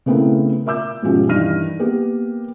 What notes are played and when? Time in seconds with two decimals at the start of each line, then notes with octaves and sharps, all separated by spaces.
0.06 C#3 A3 B3 C4 E4 A#4
0.66 A#4 E5 D6 E6 G6
1.03 G#2 B2 D#3 F3 C#4 G4
1.29 G2 D#3 E3 F6 A#6 D#7
1.79 A#3 B3 G4